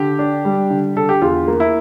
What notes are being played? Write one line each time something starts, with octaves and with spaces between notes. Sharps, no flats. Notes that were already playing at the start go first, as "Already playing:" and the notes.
Already playing: D3 G4
D4
G3
D3
D3 A4
G4
E2 F4
A#3
E4